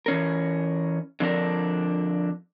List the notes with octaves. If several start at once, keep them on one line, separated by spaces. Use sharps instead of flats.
E3 C#4 A#4
D3 F3 C4 D4 A#4